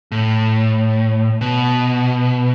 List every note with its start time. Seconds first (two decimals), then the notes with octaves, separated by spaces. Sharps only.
0.12 A2
1.41 B2